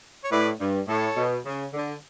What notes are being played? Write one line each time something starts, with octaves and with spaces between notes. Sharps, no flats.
C#5
A2 B4 D5
G2
A2 A4 C#5
B2
C#3
D3